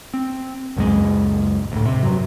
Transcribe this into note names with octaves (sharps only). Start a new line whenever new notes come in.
C4
C#2 F#2 A#2 G#3
D2 A2
C3
G2 F#3